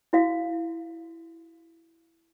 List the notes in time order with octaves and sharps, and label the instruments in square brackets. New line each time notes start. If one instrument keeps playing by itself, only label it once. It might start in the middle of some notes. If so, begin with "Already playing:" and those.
[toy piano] E4 F#4 D5 F5